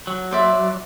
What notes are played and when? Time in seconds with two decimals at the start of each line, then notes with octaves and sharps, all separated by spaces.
0.07 F#3
0.31 C5 D5 E5